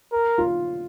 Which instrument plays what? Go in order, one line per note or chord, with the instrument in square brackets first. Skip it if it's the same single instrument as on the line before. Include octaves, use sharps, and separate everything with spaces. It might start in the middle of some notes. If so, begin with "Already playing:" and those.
[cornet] A#4
[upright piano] F4